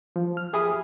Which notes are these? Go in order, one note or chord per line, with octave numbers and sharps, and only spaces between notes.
F3
F6
G4 G#4 E5 B5 D#6